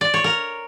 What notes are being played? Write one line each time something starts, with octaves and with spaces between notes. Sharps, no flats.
D5
C#5
A#4